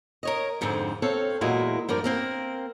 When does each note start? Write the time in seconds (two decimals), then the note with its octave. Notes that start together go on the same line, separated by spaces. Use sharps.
0.23 A#4 C#5 D#5
0.61 F2 G#2 D3 F3 C4
1.02 C4 A4 C#5 F5
1.41 E2 A#2 F#3 G#3 A#3 E4
1.89 G2 F3 A#4 D5
2.04 A#3 C4 A#4